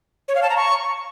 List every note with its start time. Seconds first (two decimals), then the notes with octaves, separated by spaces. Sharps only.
0.28 C#5
0.35 F5
0.43 A5
0.50 A#5
0.57 C#6